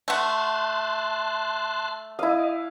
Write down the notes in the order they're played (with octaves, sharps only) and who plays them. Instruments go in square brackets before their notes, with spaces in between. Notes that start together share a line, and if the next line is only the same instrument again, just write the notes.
[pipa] A3 F#5 [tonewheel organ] A5 C6 F#6
[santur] E4 F5 [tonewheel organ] D#5